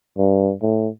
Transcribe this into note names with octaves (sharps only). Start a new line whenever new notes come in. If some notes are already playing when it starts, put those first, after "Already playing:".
G2
A2